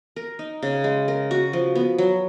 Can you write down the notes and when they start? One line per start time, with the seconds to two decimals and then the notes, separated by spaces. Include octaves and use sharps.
0.16 A#4
0.39 D#4
0.62 C#3
0.84 G#3
1.08 A#4
1.31 F#4
1.53 F3
1.75 B3
1.98 F#3